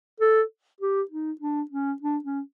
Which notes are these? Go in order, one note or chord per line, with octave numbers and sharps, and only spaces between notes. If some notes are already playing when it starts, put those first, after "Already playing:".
A4
G4
D#4
D4
C#4
D4
C#4